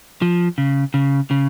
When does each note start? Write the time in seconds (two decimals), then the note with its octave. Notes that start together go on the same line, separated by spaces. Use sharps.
0.22 F3
0.58 C#3
0.94 C#3
1.31 C#3